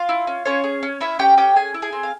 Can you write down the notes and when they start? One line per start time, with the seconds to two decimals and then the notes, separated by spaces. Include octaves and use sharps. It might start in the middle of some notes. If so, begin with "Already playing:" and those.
Already playing: F4 F5
0.09 E4
0.27 C#4
0.45 C#4 F4 C#5
0.64 G#4
0.83 C#4
1.00 C#4 E4 E5
1.19 C#4 G4 G5
1.37 C#4 G4 G5
1.56 G#4 G#5
1.74 E4
1.82 G#4 G#5
1.93 C4
2.03 F5